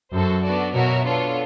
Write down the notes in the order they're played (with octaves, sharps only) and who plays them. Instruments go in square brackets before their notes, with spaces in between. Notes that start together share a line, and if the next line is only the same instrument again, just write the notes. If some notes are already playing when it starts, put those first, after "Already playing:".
[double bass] F#2 [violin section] F#4 A4 C5
[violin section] B3 D4 F#4 A4 D5
[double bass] B2 [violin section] F#4 A#4 C#5 E5
[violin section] B3 D4 F4 A4 C#5